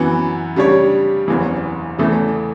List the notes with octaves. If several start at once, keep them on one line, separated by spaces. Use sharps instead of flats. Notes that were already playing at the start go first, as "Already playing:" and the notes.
Already playing: F#2 E3 B3
C#3 G3 D4 G4 C#5
F#1 E2 C#3 E3
E2 C#3 E3 A3